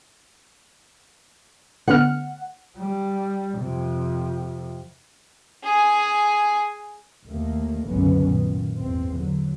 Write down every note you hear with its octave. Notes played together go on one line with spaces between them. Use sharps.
D3 B3 F#5 F6
G3
F2 C3
G#4 G#5
D#2 D#3 A3 A#3
F#1 C2 G#2 D3 B3 C#4
A#2 D#3
G#1 E2 A#2 C4
D3 F#3